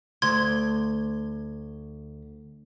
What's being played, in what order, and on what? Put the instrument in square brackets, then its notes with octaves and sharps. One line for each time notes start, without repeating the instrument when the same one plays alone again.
[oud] D2 [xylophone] C6 G#6